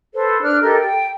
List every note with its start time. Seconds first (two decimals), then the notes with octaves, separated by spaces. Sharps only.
0.14 A4 B4 C5
0.42 D4 F6 F#6
0.61 G4 A4 A#4 D#5
0.78 G5